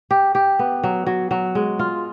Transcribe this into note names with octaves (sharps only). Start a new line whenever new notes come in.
G4
G4
B3
F#3
F#3
F#3
G#3
F4